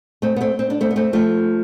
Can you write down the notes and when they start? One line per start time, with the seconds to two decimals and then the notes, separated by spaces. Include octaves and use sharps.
0.22 A3 C4
0.36 B3
0.41 A3 C4
0.59 C4
0.70 D4
0.81 A3 C4
0.91 B3
0.96 A3 C4
1.13 F3 A3